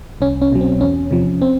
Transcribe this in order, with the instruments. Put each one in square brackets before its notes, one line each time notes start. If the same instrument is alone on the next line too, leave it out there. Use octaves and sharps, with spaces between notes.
[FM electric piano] C2 C#4
C#4
B2 F#3
C4
E2 C#4
C3 F3
C4